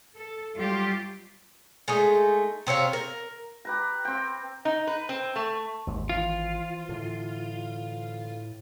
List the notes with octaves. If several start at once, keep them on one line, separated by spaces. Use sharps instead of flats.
A4
F#3 G3 F4 G4
G#3 A3 D#4
C3 C4 C#5 F5
A#4
G4 B4 A#5
C4 G5
D#4
B4
C4
A3
G#1 D#2 G#2 C3
E3 F3 F4
A2 D3 E3